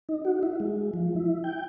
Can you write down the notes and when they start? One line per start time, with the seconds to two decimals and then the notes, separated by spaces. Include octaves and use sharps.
0.09 D#4
0.25 F#4
0.43 E4
0.60 G#3
0.94 F3
1.16 E4
1.44 G5